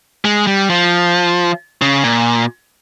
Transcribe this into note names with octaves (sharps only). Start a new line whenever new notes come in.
G#3
G3
F3
C#3
A#2